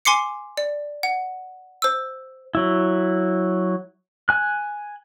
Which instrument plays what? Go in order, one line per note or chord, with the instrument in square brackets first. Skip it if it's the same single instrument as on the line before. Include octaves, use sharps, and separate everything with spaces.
[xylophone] G#5 C6 D6 C7 C#7
D5
F#5
C5 E6
[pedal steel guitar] F#3 E4
G#5 F#6